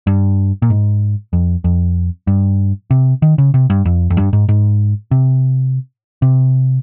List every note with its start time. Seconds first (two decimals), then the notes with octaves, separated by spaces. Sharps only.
0.07 G2
0.62 A#2
0.70 G#2
1.33 F2
1.64 F2
2.27 G2
2.91 C3
3.22 D#3
3.38 C#3
3.54 C3
3.70 G2
3.85 F2
4.10 F2
4.17 G2
4.33 G#2
4.49 G#2
5.11 C3
6.22 C3